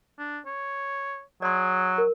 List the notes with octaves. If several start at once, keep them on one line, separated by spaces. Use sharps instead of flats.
D4
C#5
F#3 G#4 D5 C6
A#4